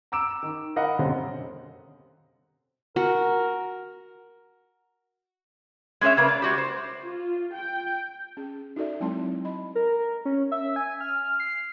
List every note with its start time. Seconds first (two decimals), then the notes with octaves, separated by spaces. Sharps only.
0.12 A#5 D6 E6 D7 E7
0.43 D#3
0.76 A#4 D#5 F5 F#5 B5
0.99 F#2 B2 D3 G3 C4
2.96 F#4 A#4
6.01 G#3 C#4 G#4 C#5 E5
6.17 C#3 A#3 B4
6.28 D5
6.42 G#3 F#4 G4
6.58 C5
7.03 F4
7.54 G5
8.37 C#4 G#4
8.76 D#4 F#4 A4 D5 E5
9.00 F#3 G#3 C4 E4 A5 C6
9.45 D#5 B5
9.75 A#4
10.25 C#4
10.52 E5
10.76 G#5
11.00 F6
11.40 C7